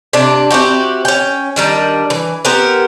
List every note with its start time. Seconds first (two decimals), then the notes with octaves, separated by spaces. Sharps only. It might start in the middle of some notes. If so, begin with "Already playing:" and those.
0.13 C3 D4
0.51 C4 E4 F#4 G4
1.05 C#4 G5
1.56 D#3 G3 D4
2.10 E3
2.45 B3 G4 A#4 C5